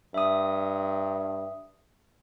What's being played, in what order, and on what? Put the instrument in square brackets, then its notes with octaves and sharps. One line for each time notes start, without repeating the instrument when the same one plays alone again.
[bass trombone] G2 [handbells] E5 D#6